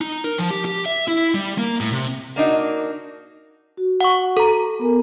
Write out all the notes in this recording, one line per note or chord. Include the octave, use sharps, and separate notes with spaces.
D#4
A#4
F3
G4
G4
E5
E4
G3
A#3
A2
C3
A#3 D4 D#4 F#4
F#4
F#5 C#6
A4 A#5
B3 A#4 G#5